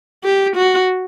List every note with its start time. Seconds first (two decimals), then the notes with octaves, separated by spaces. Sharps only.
0.24 G4
0.56 F#4